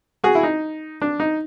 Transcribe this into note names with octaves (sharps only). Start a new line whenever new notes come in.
F#4 G#4
E4
D#4
D4
D#4